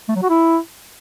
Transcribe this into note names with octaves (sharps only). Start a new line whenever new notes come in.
A3
F#3
F#4
E4